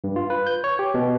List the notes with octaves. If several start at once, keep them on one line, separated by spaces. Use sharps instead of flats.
G2
F4
B4
G6
C#5
G4
B2